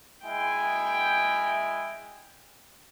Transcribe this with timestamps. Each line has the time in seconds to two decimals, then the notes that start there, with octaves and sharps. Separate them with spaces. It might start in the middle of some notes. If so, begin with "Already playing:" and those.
0.24 G#3 E4 G5 G#5